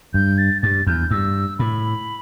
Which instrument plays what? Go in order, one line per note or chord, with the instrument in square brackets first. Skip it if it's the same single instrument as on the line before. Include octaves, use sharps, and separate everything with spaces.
[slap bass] G2 [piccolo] G6
[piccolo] A6
[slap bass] G2 [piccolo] A6
[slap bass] E2 [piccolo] G6
[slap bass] G2 [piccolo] E6
[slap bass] A2 [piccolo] B5